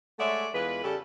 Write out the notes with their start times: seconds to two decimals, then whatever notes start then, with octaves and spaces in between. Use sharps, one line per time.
0.19 G#3 A3 C#5 D5 E5 F#5
0.55 E2 G#3 F4 B4
0.84 C#3 G3 C#4 G4 A4